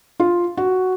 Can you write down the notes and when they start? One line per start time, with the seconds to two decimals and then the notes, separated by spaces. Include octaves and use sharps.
0.20 F4
0.57 F#4